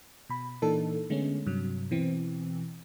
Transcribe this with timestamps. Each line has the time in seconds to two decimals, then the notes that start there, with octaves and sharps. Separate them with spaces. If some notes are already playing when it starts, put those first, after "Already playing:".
0.29 B2 B5
0.62 A#2 E3 A#3 D4 D#4 A4
1.10 D3 G#3 A3 B3 C#4
1.46 G2 C3 F#3
1.91 B2 E3 C4